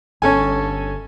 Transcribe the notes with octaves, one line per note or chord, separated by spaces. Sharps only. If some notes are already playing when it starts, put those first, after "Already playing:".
G1 C#4 A4 G#5